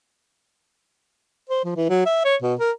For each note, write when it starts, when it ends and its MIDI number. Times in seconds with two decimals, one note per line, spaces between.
1.49 1.61 72
1.65 1.74 53
1.76 1.85 52
1.89 2.04 54
2.06 2.22 76
2.24 2.36 73
2.42 2.54 47
2.60 2.71 70